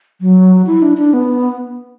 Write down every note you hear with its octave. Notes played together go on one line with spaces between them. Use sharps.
F#3
E4
D4
D4
B3